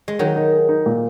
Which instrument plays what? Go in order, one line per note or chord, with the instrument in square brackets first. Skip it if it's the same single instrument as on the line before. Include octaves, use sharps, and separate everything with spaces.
[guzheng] G#3
[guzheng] D#3 F#3 [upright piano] D#4
[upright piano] D#4
G#4
D#4
A#2